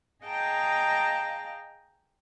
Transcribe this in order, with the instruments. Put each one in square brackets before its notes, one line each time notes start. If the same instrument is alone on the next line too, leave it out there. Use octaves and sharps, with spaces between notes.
[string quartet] G#4 D#5 F5 G5 A5 A#5